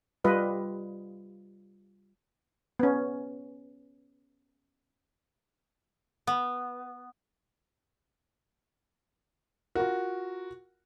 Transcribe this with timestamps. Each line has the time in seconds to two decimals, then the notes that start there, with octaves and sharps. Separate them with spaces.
0.24 G3 F4 B4 D#5
2.79 B3 C#4
6.27 B3
9.75 F4 F#4 A#4